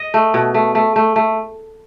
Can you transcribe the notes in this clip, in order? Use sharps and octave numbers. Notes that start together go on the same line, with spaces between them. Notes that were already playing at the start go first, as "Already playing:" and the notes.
Already playing: D#5
A3
B2
A3
A3
A3
A3